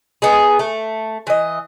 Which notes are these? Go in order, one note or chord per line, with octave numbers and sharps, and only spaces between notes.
B3 D#4 G#4
A3
E3 D#5